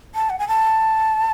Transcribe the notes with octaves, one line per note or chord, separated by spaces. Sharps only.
A5
F#5
G#5
A5